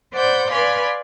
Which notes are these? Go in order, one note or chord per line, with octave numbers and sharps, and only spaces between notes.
C5 D5 F#5 B5 G6
B4 D5 F5 G#5 B5 C6